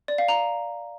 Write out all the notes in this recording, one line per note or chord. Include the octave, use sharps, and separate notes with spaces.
D5
F5
A#5